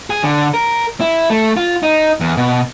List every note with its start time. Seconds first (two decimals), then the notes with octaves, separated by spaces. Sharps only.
0.10 G#4
0.23 D3
0.54 A#4
1.01 E4
1.30 A3
1.57 F4
1.83 D#4
2.20 E2
2.37 B2